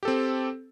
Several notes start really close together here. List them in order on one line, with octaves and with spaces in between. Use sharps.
G4 A4 C4